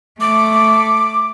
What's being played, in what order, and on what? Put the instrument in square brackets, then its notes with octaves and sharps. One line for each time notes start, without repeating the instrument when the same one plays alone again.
[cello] A3 [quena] D6